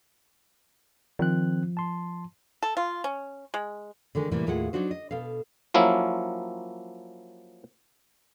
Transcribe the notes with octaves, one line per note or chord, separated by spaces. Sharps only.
D#3 F3 C4 F#6
A5 C6
A4
F4
C#4
G#3
D3 D#3 G#3
A2 C3 E3 G3 A#3
D#2 A2 G#3 F4 G#4 F#5
F#3 A3 D4 D#4 F#4 C5
D#5
B2 A4 F5
F3 F#3 A#3 C#4 E4